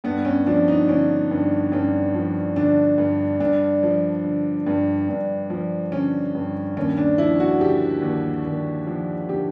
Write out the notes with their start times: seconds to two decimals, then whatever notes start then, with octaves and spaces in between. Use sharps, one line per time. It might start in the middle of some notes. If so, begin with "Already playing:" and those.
0.04 G2 B3
0.25 C#4
0.46 F3 D4
0.68 D#4
0.88 D3 C#4
1.31 G2
1.72 G2 C#4
2.14 F3
2.56 D3 D4
2.98 G2
3.40 G2 D4
3.83 F3
4.24 D3
4.66 G2
5.09 G2
5.50 F3
5.92 D3 C#4
6.35 G2
6.77 D#2 C#4
6.97 D4
7.18 F3 E4
7.40 F#4
7.60 D3 G4
8.02 D#2
8.45 D#2
8.87 F3
9.29 D3 G4